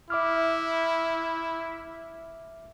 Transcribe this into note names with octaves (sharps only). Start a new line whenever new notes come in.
E4 E5 D6 F6